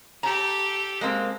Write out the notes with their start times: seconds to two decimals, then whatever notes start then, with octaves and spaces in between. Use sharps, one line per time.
0.23 G4 A4 A#5
1.01 G#3 A#3 C4